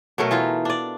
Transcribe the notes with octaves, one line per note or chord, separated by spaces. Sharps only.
B2 F#3 A3 A#4
E3 D#4 F4
D4 D5